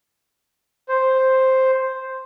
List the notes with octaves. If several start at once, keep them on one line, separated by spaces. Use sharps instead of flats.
C5